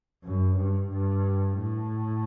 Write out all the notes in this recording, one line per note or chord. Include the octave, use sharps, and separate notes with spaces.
F#2
G2
G2
A2